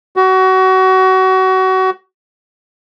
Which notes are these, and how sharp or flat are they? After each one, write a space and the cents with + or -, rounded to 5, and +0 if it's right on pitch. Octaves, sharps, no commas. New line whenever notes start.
F#4 +25